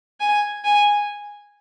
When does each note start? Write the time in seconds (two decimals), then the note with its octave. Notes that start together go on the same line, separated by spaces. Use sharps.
0.20 G#5
0.64 G#5